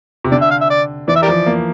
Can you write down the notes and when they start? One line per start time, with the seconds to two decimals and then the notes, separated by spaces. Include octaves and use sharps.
0.24 C3
0.31 D3 D5
0.42 E5
0.51 F5
0.61 E5
0.70 D5
1.08 E3 D5
1.16 E5
1.22 G4 A#4 D5
1.28 F3
1.46 A#3